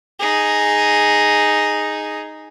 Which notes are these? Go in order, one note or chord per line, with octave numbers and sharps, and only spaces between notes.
D#4 G#4